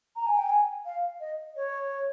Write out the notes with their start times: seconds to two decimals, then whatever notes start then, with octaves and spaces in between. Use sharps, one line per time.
0.16 A#5
0.27 G#5
0.38 G5
0.50 G#5
0.85 F5
1.20 D#5
1.56 C#5